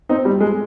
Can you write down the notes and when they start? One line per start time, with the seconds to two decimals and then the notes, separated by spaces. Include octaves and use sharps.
0.09 C4 D#4
0.25 G3
0.41 G#3